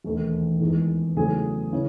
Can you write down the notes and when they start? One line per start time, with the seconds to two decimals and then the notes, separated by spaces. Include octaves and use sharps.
0.04 E1 D#2 D#3 A3
0.60 E2 D#3 G#3
1.17 E2 C#3 F#3 A3 G#4 G#5
1.72 C#3 E3